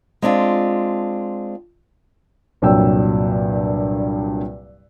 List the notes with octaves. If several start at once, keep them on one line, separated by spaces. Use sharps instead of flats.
G#3 C4 D4 F4
C2 G2 A#2 F#3 G5 E6